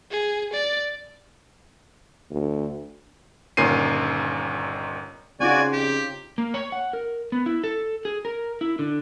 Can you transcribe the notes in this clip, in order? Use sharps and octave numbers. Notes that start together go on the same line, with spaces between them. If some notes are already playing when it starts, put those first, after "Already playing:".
G#4
D5
D2
G1 A#2 D#3 C#4 C7 D#7
C#3 C4 D#4 F4 F#4 D5 G#5
F2 G4
A#3
C#5
F#5
A#4
B3
E4
A4
G#4
A#4
E4
D3